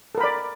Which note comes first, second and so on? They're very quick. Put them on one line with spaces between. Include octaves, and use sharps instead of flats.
A4 A#4 B5 D5